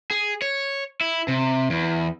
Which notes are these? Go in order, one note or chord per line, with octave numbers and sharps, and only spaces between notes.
G#4
C#5
E4
C3
E2